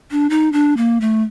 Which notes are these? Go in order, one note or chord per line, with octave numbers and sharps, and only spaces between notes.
D4
D#4
D4
A#3
A3